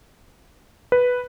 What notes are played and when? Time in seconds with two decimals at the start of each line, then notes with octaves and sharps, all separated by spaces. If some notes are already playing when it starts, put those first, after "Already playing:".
0.92 B4